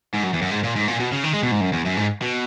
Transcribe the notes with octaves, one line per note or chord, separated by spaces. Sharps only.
G#2
F#2
E2
F#2
G#2
A#2
G#2
A#2
B2
C#3
D#3
G#3
B2
G#2
F#2
E2
F#2
G#2
B2